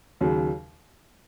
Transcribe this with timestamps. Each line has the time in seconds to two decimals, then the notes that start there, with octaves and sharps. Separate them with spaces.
0.21 D#2 C#3 F#3